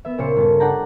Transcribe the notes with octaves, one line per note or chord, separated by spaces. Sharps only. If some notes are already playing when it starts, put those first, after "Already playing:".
B3 E5
C#2 A#2 C#3 C5 C#7
G1 A4
D4 D5 F#5 G5 A5 A#5